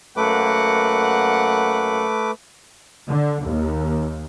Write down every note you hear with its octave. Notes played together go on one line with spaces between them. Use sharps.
F#2 A3 A#3 B4 F#5 D6
D3
D#2